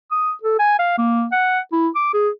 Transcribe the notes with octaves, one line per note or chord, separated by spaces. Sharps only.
D#6
A4
G#5
F5
A#3
F#5
E4
D6
G#4